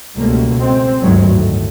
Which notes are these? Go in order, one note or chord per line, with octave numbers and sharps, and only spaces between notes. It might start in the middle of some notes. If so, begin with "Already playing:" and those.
C#2 B2 G3 A3 A#3
G#3 C4
G1 D2 G#2 D#3 F#3 G#3
A2